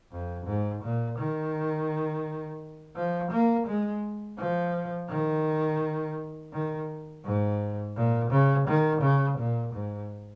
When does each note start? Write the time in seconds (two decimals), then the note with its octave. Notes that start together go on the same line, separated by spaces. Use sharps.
0.12 F2
0.46 G#2
0.83 A#2
1.18 D#3
2.96 F3
3.32 A#3
3.67 G#3
4.38 F3
5.10 D#3
6.53 D#3
7.25 G#2
7.96 A#2
8.31 C#3
8.68 D#3
9.02 C#3
9.39 A#2
9.74 G#2